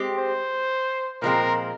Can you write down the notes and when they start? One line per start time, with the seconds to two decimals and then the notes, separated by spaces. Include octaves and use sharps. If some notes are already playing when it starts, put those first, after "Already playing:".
Already playing: G#3 C4 G4
0.18 C5
1.22 A#2 F3 G#3 C4 A#4